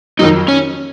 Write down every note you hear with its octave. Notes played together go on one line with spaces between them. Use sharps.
F2 D#3 F#3 D#4 D#5
C#4 C#5